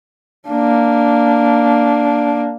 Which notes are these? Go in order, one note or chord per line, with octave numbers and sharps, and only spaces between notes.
A#3 D4